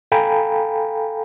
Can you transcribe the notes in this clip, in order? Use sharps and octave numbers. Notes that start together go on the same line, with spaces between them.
A4 F5 G5 G#5 A#5 B5